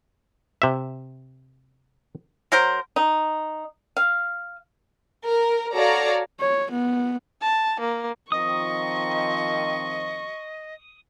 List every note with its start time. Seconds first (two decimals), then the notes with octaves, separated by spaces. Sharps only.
0.62 C3 E5
2.52 F#3 A#4 C5
2.96 D#4
3.97 F5
5.24 A#4
5.74 F#4 A4 C#5 D5 F5 A#5
6.40 C#5
6.71 B3
7.41 A5
7.80 A#3
8.32 D#3 F3 C4 D#5 C#6 D#6